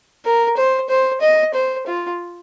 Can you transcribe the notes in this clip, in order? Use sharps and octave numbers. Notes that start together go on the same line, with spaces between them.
A#4
C5
C5
D#5
C5
F4